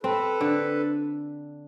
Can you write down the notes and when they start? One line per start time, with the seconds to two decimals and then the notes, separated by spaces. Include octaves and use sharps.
0.03 C4 A4 B4
0.41 D3